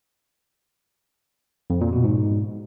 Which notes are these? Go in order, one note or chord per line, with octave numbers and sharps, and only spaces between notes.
F2
A#2
B2
G#2